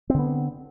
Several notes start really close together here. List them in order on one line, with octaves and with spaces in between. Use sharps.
C4 D3 B3